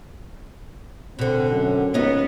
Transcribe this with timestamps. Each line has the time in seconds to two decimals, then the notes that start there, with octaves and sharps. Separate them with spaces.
1.19 B2 D3 C4
1.51 F#2
1.94 C#2 B3 C#4 D#4